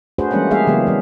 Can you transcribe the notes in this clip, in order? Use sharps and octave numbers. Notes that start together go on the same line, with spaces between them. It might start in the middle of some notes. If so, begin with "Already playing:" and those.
A3 D4 F#4 G#4 B4 C5
E3 G3 G#3 A#3 C#4 F#5
G3 A3 A#3 G#4 E5 F5
C#3 E3 F#3 G#3 A#3 B3
E3 G3